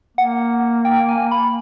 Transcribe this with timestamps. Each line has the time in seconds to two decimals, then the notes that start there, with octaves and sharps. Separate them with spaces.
0.17 A#3 F#5
0.85 G5
1.09 G#5
1.31 B5